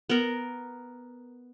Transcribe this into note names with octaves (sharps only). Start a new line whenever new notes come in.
B3 A#4